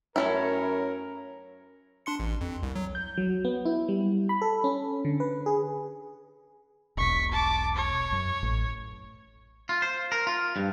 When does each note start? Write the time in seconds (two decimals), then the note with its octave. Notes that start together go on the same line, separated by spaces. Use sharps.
0.16 F#2 A3 C#4 E4 A#4 C#5
2.06 D4 C6 C#7
2.20 A1
2.41 F2
2.63 C2
2.76 F#3
2.95 G6
3.17 F#3
3.45 B3
3.65 E4
3.89 G3
4.29 B5
4.42 A4
4.64 C#4
5.05 D3
5.20 B4
5.46 G#4
6.97 E1 B1 C#6 B6
7.31 A5 D6
7.76 C#5
8.12 F#2
8.43 A1
9.69 F4
9.82 C5
10.12 A#4
10.27 F4
10.56 G2